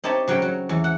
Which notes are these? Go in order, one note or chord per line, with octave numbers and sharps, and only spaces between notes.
C4 D#4 G4 C#5 A5
C#3 F#3 C#5 G5
F#3
E2
F#5